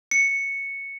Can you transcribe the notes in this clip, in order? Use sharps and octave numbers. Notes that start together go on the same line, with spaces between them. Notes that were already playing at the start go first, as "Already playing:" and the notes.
C#7